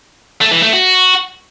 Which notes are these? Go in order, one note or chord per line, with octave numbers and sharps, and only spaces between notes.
A3
E3
A3
F#4